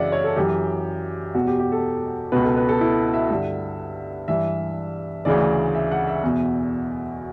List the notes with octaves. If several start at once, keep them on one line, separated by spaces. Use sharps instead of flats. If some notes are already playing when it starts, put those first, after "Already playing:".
Already playing: F#2 C#3 E3 D5 E5 F#5
C#5
A4
F#2 E3 G4
E2 B2 F#4
G4
G4
A4
C#2 B2 B4
A4
B4
A4
E4
E5
G2 D3
G2 E3 E5
D2 C#3 E3 D5
E5
F#5
E5
E2 B2